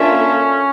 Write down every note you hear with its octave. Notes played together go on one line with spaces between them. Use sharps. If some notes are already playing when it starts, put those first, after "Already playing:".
Already playing: A#3 C#4 D4 F4 A4 E5